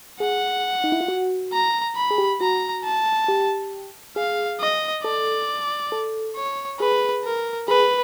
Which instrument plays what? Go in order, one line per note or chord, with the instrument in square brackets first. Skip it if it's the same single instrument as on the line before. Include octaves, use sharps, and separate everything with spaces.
[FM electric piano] G#4 [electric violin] F#5
[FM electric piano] D#4
E4
F4
F#4
[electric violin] A#5
B5
[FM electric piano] G#4
G4
[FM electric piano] F#4 [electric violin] A#5
[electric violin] A5
[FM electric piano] G4
[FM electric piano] G#4 [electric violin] F5
[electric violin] D#5
[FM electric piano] A4 [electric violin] D5
[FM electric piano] A4
[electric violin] C#5
[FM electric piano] G#4 [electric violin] B4
[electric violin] A#4
[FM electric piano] G#4 [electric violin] B4